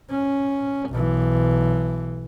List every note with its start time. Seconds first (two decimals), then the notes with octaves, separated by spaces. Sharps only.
0.10 C#4
0.90 B1 E3